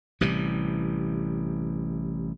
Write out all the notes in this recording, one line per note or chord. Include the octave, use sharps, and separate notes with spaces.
A1 C3 E3 G3